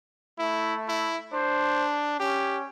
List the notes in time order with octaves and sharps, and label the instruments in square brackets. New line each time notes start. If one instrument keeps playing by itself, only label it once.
[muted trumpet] A3 [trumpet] E4
[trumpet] E4
[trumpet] D4 [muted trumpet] C5
[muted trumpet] C#4 [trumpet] G4